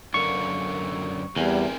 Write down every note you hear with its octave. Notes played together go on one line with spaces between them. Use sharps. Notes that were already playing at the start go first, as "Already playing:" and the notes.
F#2 D3 A#3 C#6
E2 G3 C4 A#4 G#5